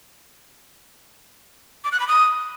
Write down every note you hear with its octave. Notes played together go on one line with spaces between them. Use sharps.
D6
F#6
B5
D#6